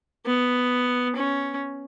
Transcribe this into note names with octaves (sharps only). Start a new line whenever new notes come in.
B3
C#4